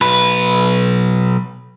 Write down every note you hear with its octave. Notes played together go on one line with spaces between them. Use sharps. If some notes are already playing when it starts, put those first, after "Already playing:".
B1 B4